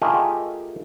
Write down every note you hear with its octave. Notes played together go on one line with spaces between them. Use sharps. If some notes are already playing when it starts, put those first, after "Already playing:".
A3 F4 G4 G#4 A#4 D#5